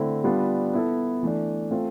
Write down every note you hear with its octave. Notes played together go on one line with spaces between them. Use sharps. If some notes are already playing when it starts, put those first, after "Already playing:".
Already playing: D3 A3 C4 E4
G3 B3 D4 F4
B3 E4 A4
E3 A3 D4
A3 C4 F4